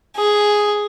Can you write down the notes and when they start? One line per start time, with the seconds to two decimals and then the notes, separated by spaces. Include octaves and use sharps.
0.17 G#4